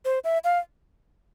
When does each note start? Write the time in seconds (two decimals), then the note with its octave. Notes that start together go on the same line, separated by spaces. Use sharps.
0.05 C5
0.24 E5
0.44 F5